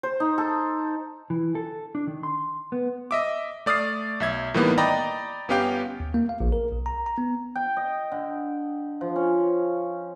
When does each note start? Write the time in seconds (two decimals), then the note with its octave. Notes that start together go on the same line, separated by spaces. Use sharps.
0.03 C5
0.20 D#4
0.38 A4
1.30 E3
1.55 A4
1.95 D4
2.07 D#3
2.23 C6
2.72 B3
3.11 D#5 E5 D6
3.66 A3 D5 D#6 F6 C7
4.20 B1 E5 G#6
4.54 A2 D#3 E3 G3 A#3 B3
4.78 D5 D#5 G5 A#5 B5
5.48 G1 B3 C#4 G4 F5 G5
6.00 D#2
6.14 A#3
6.29 F5
6.40 A#1
6.52 A#4
6.72 B1
6.86 A#5
7.06 A#5
7.18 B3
7.55 G5
7.77 D#5
8.12 D3
9.01 F3
9.16 C#4